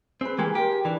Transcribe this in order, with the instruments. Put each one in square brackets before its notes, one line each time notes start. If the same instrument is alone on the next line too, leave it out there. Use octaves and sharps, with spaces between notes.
[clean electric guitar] C4 [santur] G#4 B4
[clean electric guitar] E3 G#3 A#3 [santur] G4 G#4 A#4
[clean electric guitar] G4 [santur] A#4 C5
[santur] G#5
[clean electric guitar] E3 [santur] D4